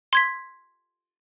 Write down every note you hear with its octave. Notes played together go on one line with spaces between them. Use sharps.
C6 G#6 B6